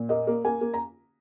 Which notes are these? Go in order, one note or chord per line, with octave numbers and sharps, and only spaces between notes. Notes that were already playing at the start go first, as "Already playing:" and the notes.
Already playing: A#2
A#3 D#5
A#3
A#3 G#5
A#3
A#5